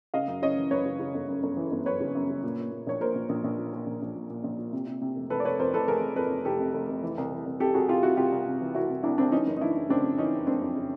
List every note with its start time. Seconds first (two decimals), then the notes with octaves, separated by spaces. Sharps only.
0.14 C#3 D#5 F5
0.28 F#2
0.42 C#3 C#5 D#5
0.57 E3
0.71 F#2 B4 C#5
0.85 C#3
0.99 C#3
1.14 G1
1.28 F#2
1.43 G1
1.57 E3
1.72 G1
1.86 F#2 B4 C#5
2.00 C#3
2.15 F#2
2.29 C#3
2.43 A#2
2.58 A#2
2.72 A#2
2.87 A#1 C#5
3.00 A#2 A#4 C5
3.15 A#1
3.29 A#1
3.44 A#1
3.58 A#2
3.73 A#2
3.86 A#1
4.02 A#1
4.16 A#2
4.30 A#2
4.44 A#1
4.59 A#2
4.73 C3
4.87 C3
5.02 C3
5.16 F1
5.30 F1 A4 B4
5.40 D5
5.45 F1 B4 C#5
5.59 F2 A#4 C5
5.74 F1 A4 B4
5.88 F1 G#4 A#4
6.02 F1
6.16 F2 A4 B4
6.30 C3
6.45 F1 G4 A4
6.60 C3
6.74 F1
6.88 F1
7.03 E3
7.18 C2
7.31 E3
7.46 C2
7.60 C3 G4 A4
7.74 C2 F#4 G#4
7.89 C2 F4 G4
8.03 C3 E4 F#4
8.17 C2 F4 G4
8.32 C2
8.46 C3
8.61 E3
8.75 C2 E4 F#4
8.89 C2
9.03 C2 D4 E4
9.18 C2 C4 D4
9.32 E3 C#4 D#4
9.47 F#1
9.57 D#4
9.61 E3 D4 E4
9.76 F#1
9.89 C#3 C4 D4
10.04 F2
10.18 E3 C#4 D#4
10.33 F#1
10.47 F#1 C4 D4
10.62 F2
10.76 C#3